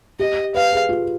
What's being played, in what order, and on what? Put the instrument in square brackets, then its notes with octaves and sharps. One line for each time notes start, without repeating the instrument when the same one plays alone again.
[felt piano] G4 [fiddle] D#5
[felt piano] B4 [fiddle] F5
[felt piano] G#4
F4